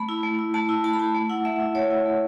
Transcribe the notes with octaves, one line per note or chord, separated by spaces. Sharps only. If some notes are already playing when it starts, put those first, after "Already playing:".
Already playing: A3 B5
E4
A3
E4
A3 A5
E4
A3 A5
B5
E4 A5
A3
E4 F#5
A3 E5
E4
A3 C#5
E4
A3